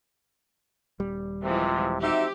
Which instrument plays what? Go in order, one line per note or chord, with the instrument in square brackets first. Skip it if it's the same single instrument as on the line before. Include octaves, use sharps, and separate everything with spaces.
[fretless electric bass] D#1 G3
[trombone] C3 [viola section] E3 F3 G#3
[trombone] C4 [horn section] D#4 F#4 E5 [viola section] G4